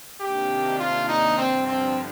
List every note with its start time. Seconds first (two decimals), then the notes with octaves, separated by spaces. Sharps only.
0.20 C3 D#3 A#3 D4 G4
0.79 F4
1.08 D#4
1.37 G2 D3 F3 C4
1.67 C4